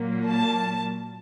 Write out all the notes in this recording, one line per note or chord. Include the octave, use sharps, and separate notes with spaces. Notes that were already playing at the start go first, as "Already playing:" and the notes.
Already playing: A#2 F#3 A#3
A5